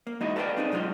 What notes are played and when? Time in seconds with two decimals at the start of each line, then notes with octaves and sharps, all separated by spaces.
0.07 A#3
0.20 E2 G#3 D#4 E4 F#4 D#5
0.36 A4 B4 D5 E5 F5 G5
0.57 C4 D4 D#4 G#4
0.72 B1 F#3 G#3 F4 C6